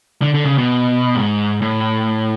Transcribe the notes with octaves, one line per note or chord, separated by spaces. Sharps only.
D3
D3
C#3
B2
G#2
A2